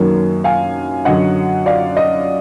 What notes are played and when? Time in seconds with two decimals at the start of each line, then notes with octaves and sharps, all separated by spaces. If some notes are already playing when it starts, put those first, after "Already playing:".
Already playing: F#2 D#3 F#3 A#3
0.44 F5 G#5
1.05 F#2 D3 F#3 D#5 F#5
1.66 D5 F5
1.97 D#5